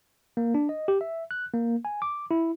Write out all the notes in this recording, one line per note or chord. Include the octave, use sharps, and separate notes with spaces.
A#3
D4
D#5
G4
E5
F#6
A#3
G#5
D6
E4